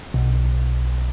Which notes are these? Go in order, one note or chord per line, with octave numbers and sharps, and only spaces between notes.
B1